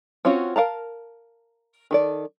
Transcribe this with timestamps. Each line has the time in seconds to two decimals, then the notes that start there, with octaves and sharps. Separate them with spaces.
0.25 C4 C#4 F4 F#4 C#5
0.56 A#4 F5 A5 A#5
1.91 D#3 A4 D5